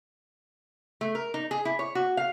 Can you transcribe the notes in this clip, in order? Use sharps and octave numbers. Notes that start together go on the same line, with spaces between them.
A3
A#4
D#4
G#4
E4
C#5
F#4
F5